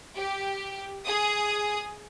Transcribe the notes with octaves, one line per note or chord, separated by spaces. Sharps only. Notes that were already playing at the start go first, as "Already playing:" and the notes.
G4
G#4 D#6